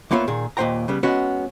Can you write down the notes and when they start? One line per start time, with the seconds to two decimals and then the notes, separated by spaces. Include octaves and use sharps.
0.11 D2 A#3 B3 F4 C#5 E5
0.28 A#2 D#3 G#4
0.57 D#2 A#2 D#4 C5 G5 A#5
0.88 C#3 G3 B3
1.03 G#3 B3 C#4 F#4